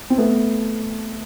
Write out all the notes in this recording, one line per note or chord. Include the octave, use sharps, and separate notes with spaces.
C4
A3 B3